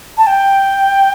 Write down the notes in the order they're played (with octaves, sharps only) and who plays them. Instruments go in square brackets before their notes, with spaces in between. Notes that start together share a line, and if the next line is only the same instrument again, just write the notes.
[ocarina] A5
G5